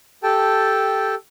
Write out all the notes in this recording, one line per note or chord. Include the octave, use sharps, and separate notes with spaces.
G4 A4 G5 A5